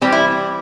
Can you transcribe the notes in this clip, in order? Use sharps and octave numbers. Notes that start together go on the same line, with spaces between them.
E3 G3 C4 G4
E4